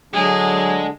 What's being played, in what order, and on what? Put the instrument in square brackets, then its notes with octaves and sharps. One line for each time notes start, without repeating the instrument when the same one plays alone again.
[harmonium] D3 D4 [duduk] F#3 [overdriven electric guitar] G#3 [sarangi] G#4